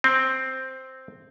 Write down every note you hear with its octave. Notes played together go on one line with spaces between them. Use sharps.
C4